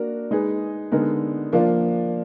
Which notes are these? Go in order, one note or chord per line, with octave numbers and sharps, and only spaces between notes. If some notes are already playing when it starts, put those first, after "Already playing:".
Already playing: A#3 D4 F#4 A#4
G#3 D#4 G#4 B4
D3 G#3 B3 D#4 A#4
F3 A#3 D4 F4